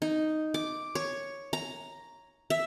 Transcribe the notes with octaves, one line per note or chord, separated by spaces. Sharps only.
D#4
D6
C#5
A#5
E5